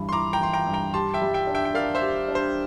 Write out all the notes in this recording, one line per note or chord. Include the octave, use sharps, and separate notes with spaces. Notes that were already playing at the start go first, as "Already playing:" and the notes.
Already playing: G2 E3 E4
C6
E4 A#5 D6
G5 A#5
E3 C6
G5 A#5
G2
G5 A#5
G4 A5 C6
E5 G5
G3
E5 G5
D4
E5 G5
G5
A#4 D5 F5
C5 E5
G4
D4
C5